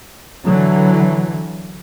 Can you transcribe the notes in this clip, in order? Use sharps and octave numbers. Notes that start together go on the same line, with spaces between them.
D3 E3 F#3